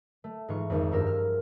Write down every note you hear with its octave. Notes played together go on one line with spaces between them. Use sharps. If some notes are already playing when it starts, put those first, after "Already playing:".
A3
G#2 E3 F4 C#6
G#1 F2
G2 F4 G4 A#4 E6
F6